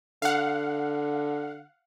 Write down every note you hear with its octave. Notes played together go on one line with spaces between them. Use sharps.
D3 F5 F#5